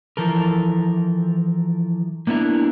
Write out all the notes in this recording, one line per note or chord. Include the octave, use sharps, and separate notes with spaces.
E3 F3 A4 A#4
A#3 B3 D4 E4 A#4